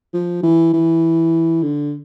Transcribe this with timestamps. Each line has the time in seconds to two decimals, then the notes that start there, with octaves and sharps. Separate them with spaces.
0.14 F3
0.43 E3
0.73 E3
1.63 D3